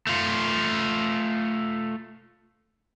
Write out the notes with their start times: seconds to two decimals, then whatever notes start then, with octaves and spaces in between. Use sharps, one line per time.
0.07 A3 F4